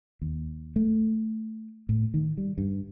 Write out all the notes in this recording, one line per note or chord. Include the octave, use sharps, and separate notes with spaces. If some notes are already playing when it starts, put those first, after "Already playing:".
D#2
A3
A2
D#3
G3
G2